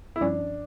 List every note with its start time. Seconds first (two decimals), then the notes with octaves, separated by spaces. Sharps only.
0.16 E4
0.21 G2 F3 C#4 D4